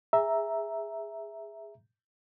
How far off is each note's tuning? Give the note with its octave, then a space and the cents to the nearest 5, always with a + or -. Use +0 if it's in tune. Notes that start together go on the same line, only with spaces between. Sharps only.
G#4 -10 E5 +0 A#5 +0